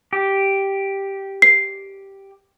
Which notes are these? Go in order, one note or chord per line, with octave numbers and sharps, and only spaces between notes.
G4
C7